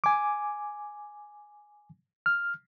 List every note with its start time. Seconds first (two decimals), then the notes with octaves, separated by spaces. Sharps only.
0.04 G#5 D6
2.26 F6